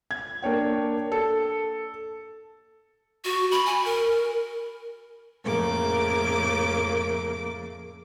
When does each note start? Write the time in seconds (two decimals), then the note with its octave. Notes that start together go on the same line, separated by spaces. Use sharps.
0.11 G#6
0.42 A#3 D4 C#5 G5
1.12 A4
3.25 F#4
3.51 B5
3.66 G#5
3.85 A#4
5.43 F2 A2 C#3 A#3 D6